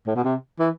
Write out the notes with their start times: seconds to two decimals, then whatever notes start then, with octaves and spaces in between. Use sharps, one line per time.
0.07 A2
0.15 B2
0.24 C3
0.59 E3